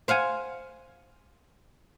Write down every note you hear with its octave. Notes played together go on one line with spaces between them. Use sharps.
C5 F5 F#5 G#5